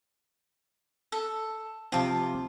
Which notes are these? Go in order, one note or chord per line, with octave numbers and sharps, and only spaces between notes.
A4
C3 F3 C4 F4 A5 D6